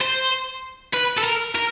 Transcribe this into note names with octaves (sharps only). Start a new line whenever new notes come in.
C5
B4
A4
A#4
A#4